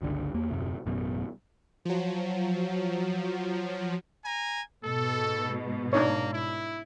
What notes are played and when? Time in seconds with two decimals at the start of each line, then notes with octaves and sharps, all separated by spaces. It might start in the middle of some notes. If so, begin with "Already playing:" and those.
0.02 G1 C#2 D3
0.34 E2 A#3
0.51 D#1 F#2 C3
0.86 A1 F#2 B2
1.85 F3 F#3
4.25 G#5 A#5
4.84 G#2 B2 A4
5.93 A#3 D4 D#4 C#5
6.31 E4